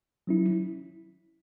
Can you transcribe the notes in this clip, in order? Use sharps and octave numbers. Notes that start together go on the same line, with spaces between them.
F#3 C#4 E4